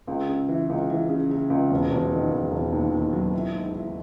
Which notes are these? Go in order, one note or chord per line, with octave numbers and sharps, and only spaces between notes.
C#2
C#3
E3
C#2
E3
C#3
C#3
C#2
E1
E1
D#3
E1
E1
D#2
D#2
F#3
E4
G#2
E4